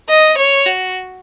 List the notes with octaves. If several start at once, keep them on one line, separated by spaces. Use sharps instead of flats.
D#5
C#5
F#4